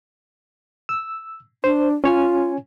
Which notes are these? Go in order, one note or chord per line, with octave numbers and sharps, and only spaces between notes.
E6
D4 C5
C#4 F4 C#5 G#5